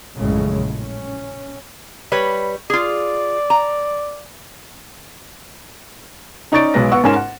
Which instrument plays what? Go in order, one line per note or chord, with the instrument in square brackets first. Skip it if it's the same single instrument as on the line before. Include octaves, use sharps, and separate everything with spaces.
[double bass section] A#1 F#2 A2 C#3 G#3
C#4
[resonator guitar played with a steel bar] G3 B4 C#5
[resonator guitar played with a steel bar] F4 G#4 [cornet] D5
[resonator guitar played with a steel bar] A#5
[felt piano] C#4 D#4 D5 C#6 A6 D7
B1 G#3 B4 A#6
B3 F#5 C#6 E6
G#2 C#4 A#4 G#5 C6 E7
F#5